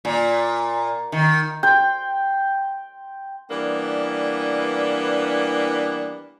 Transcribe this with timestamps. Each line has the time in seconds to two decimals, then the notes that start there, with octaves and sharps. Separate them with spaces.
0.05 A#2
1.12 D#3
1.63 G5 C6
3.50 E3 G3 A#3 B3 D4